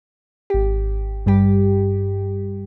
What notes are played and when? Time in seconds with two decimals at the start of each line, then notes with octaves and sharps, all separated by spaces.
0.50 G#1 G4
1.26 G2 G3 G4